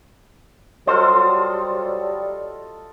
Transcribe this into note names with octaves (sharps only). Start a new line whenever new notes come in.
F#3 G3 F4 A4 C5 D#5